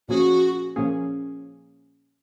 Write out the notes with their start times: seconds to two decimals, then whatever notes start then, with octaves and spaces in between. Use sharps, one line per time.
0.08 A#2 F3 A#3 C#4 F#4 G#4
0.76 A#2 F3 A#3 C#4 G#4